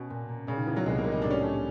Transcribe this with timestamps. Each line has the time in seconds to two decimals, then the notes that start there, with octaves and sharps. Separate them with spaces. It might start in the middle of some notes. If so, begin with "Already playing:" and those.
Already playing: B2 C#4
0.10 A#2
0.28 A#3
0.47 A#2 C#3
0.57 D#3
0.67 E3 B3
0.76 F#3
0.86 C2 G#3
0.98 A#3
1.04 G3
1.12 D#4
1.22 A2 D4
1.31 C#4
1.41 A3 D4